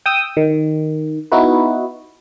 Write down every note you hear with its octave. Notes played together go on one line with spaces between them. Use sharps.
G5 D#6 E6
D#3
B3 D#4 E4 F#4 B4